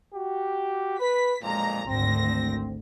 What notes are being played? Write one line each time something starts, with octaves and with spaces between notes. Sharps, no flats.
F#4 G4
B4 B6
B1 F2 A#2 G#3 A#5
G#1 D2 C4 A#6